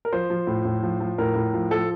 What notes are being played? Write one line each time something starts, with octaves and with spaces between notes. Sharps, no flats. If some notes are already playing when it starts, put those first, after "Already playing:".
A#4
F3 C5
F3
A2
A2
F3
F3
A2 A#4
A2
F3
F3 A4